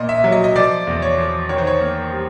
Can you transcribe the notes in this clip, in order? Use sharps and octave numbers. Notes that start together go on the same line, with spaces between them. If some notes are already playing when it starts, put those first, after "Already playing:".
Already playing: A#2 A#3 D#5
E5
F#3
D#5
D#5
F3 D5
E2
C#5
F3
D#3 C#5
C5
C#5
A#3
G3